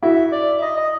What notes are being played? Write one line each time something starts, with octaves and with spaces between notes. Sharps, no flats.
E4 F#4 E5
D5
E5
D#5
D#5